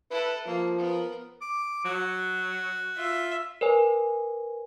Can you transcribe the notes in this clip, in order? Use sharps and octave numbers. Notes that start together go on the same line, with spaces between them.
E4 A4 B4
F3 A#3
B3 A#4
D6
F#3 F#4
F4 E5
A#4 B4 C#5 G#5